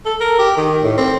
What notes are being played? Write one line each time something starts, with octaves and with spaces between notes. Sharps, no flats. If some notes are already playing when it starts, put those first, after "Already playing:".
A4
A#4
G4
D#3
A2
C4